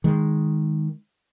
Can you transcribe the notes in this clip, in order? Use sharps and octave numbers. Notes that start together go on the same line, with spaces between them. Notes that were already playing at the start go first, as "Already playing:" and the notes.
D#3 G#3